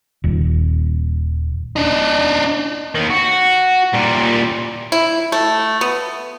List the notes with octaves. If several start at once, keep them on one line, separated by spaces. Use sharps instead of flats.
D#1
D4 D#4
D#2 D#3
F#4
A#2 G3
E4
A3
B3